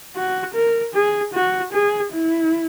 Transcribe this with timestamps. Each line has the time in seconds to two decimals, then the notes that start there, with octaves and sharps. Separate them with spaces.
0.16 F#4
0.54 A#4
0.94 G#4
1.34 F#4
1.73 G#4
2.13 E4